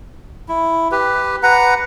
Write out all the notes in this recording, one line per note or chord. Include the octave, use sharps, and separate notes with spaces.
E4
G4 B4
B4 F#5 A#5